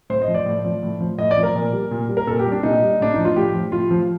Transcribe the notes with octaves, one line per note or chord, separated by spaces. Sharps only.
A2 C5
D#5
F3
D5
A2
F3
A2
F3
A2 D#5
D5
F3
A#4
A#2
G3
A#2
G3
A#4
A#2 A4
G4
G3
D4
A#2 D#4
G3
A2 D4
F3 D#4
F4
A2 G4
F3
A2 F4
F3